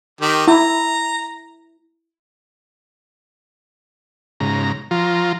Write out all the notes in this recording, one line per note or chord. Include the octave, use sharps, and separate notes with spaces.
D#3 G4
E4 A#5
G#2 C#3 A#5
F3 F4 A#5